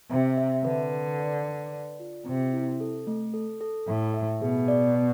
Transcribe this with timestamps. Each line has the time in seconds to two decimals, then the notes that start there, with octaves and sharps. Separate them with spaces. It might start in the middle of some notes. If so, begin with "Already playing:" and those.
0.10 C3 E5
0.38 E5
0.65 D3 B4
0.91 B4
1.19 D5
1.45 B4
1.73 D5
2.00 F4
2.26 C3 C4
2.53 E4
2.80 A4
3.07 A3
3.34 A4
3.61 A4
3.88 A2 E5
4.14 E5
4.41 B2 G#4
4.68 D5
4.95 D5